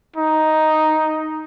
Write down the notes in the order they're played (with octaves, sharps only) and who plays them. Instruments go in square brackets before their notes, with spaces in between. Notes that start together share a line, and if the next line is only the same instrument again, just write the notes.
[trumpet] D#4